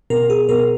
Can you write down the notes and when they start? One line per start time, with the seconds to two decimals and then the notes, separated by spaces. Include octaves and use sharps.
0.10 B2 A#4
0.30 G#4
0.49 B2 A#4